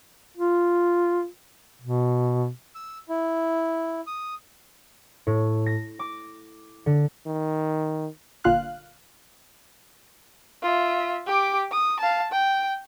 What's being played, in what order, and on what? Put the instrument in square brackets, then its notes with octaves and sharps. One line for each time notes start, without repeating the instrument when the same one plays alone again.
[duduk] F4
B2
[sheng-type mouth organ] E6
E4
D#6
[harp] A2
A#6
D6
D3
[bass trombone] D#3
[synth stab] G1 A#2 D3 F4 F5 F#6
[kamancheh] F4 E5
G4 D6
D#6
F5 A5
G5